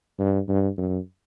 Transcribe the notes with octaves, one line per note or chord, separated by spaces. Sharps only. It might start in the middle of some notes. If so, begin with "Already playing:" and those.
G2
G2
F#2